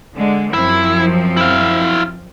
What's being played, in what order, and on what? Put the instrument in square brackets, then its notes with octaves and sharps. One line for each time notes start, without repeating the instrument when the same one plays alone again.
[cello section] D3 G#3
[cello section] F#2 F3 C4 [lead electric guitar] E4
[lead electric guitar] E4 F5